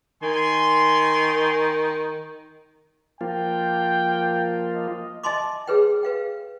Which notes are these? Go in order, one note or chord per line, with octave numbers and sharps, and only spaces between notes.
D#3 G#5 C6
F3 A#3 F4 G5
D#5
D#5 E5 G#5 A5 C6 D6
G#4 A4 B4 C#5 G5
B4 F5 G5